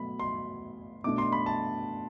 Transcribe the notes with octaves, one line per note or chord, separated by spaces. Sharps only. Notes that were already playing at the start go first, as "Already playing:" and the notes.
Already playing: B2 F#3 A3 B5
C6
B2 A3 D4 D6
C6
B5
A5